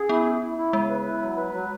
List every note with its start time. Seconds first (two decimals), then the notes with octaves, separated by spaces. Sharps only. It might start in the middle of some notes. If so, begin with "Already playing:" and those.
Already playing: C#4 G#4
0.09 B3 E4
0.26 E4
0.41 E4
0.58 E4
0.73 C#3 G#3
0.89 B4
1.05 E4
1.22 F#3
1.37 B4
1.54 F#3